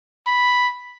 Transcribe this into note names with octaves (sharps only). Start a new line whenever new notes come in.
B5